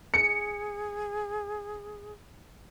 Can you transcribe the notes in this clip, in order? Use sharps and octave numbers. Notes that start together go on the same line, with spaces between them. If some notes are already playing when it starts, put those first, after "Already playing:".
G#4 C#7